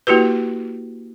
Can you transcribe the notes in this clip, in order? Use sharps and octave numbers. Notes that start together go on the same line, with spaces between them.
A#3 E4 F#4 G4 B4